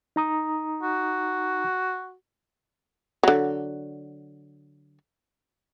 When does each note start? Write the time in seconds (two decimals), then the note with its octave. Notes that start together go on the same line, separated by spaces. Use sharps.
0.16 D#4 A#5 D#6
0.83 F#4
3.23 D3 F#3